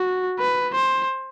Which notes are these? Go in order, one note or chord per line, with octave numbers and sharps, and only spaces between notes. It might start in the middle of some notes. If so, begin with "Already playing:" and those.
Already playing: F#4
B4
C5